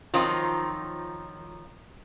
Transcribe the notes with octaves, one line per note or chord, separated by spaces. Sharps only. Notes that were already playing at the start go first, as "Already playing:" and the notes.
D#3 F3 F#3 C4 D#4 F4